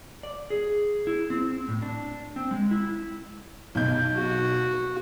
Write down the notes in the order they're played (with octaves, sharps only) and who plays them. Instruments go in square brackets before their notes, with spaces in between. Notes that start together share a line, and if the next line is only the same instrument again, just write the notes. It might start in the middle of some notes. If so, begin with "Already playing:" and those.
[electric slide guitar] D5
G#4
E4
C4
A2
D4
C4
G#3
E4
[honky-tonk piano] B1 G6
[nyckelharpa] F#4